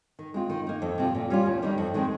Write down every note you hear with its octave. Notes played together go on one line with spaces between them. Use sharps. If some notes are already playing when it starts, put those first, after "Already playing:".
D#3
G#3 C4 F4
D#3
A#3 D#4
F2
C3 F3 C4 F4
A#2
G3 C#4 F4
D#2
D#3 G3 A#3 D#4
F2
D#3 G#3 C4